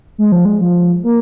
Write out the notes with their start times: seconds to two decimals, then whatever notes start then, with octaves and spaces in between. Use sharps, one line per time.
0.18 G#3
0.32 F3
0.45 G#3
0.61 F3
1.04 A#3